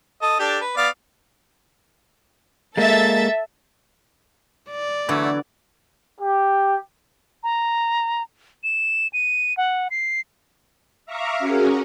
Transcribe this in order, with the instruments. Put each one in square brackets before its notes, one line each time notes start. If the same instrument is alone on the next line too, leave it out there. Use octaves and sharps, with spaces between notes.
[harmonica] A4 D#5
D4 G4 A4
B4
B3 D5 F5
[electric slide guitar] G#3 A#3 [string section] A4 E5 A6
[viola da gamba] D5
[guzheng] D3 B3 [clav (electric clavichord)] E3 F#3 [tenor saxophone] A3
[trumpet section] G4
[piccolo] A#5
E7
D#7
F#5
C7
[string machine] E5 F5 A#5 C#6 D6
C#4 F#4 G#4 A#4